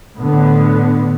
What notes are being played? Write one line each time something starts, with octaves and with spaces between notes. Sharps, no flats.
A2 D3 B3